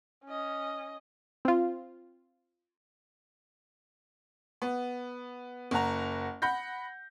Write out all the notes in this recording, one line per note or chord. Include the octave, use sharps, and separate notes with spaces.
C#4 D#5
C4 F4
B3
F#1 F#5 A#5
F#5 B5 G6 A#6